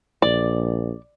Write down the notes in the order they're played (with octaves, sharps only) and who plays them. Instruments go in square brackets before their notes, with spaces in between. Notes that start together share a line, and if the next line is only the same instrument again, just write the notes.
[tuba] A#1 [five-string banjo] D5